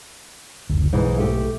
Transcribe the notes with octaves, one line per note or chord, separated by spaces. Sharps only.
F#1 D2
B1 G#2 E3
A3 G4